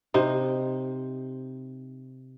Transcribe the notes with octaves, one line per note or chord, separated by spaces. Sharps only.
C3 D#4